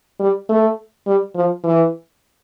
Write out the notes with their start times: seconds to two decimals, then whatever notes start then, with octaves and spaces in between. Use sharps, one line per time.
0.20 G3
0.49 A3
1.07 G3
1.35 F3
1.64 E3